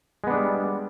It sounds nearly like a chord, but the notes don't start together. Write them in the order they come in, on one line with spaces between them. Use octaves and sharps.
G#3 B3 D4 G3